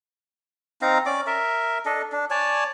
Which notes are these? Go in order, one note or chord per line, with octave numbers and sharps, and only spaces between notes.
C4 D#4 F5 A#5
C#4 D5 D6
A#4 E5
D4 A4 D#5
D4
C#5 D5 G#5 A5